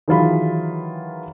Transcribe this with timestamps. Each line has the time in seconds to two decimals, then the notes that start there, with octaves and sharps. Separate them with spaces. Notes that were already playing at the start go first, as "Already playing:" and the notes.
0.08 D#3 E3 F#3 F4 G#4 B5